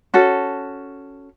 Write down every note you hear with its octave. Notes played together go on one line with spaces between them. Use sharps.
C#4 F#4 A4